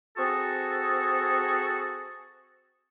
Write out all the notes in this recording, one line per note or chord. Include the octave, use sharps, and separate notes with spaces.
C4 F#4 G#4 A4